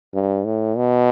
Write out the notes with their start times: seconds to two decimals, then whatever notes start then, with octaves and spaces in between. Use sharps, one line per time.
0.14 G2
0.45 A2
0.77 B2